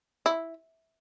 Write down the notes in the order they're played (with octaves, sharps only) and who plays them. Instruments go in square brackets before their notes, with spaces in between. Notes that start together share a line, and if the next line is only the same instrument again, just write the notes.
[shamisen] E4